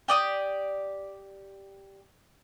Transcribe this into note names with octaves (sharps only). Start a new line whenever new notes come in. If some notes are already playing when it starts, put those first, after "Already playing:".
G4 D5 D#6